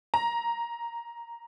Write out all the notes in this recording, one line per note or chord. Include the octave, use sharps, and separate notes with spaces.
A#5